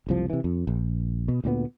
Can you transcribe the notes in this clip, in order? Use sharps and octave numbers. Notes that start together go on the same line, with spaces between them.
F#1 C2 F3
C3 E3
F2
A#1
B2
D2 A#2 F#3 B3